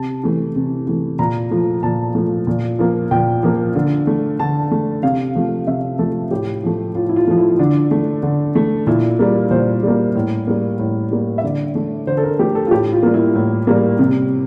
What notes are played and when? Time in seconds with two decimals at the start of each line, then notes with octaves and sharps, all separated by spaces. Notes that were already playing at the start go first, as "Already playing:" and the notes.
Already playing: C3 A5
0.23 E3 A3
0.56 C3
0.87 E3 A3
1.19 A#2 A#5
1.51 F3 A3
1.83 A#2 A5
2.15 F3 A3
2.47 A#2
2.79 F3 A#3
3.11 A#2 G5
3.43 F3 A#3
3.75 D3
4.07 A3
4.39 D3 A5
4.71 A3
5.03 C3 F5
5.35 F3 A3
5.67 C3 E5
5.99 F3 A3 A4
6.31 A2 G4
6.63 F3 A3
6.95 A2 F4
7.09 E4
7.16 F4
7.27 F3 A3
7.38 E4
7.59 D3 D4
7.91 A3
8.23 D3
8.55 A3
8.87 A#2 E4
9.19 G3 A#3
9.51 A#2 C5
9.83 G3 A#3
10.15 A2
10.47 G3 A#3
10.79 A2
11.11 G3 A#3
11.38 E5
11.43 D3 D5
11.75 A3
12.07 D3 C5
12.17 A4
12.23 A#4
12.39 A3 G4
12.55 A4
12.67 F4
12.71 A2 G4
12.92 F4
13.03 G3 A#3
13.14 E4
13.35 A2
13.67 G3 A#3
13.99 C3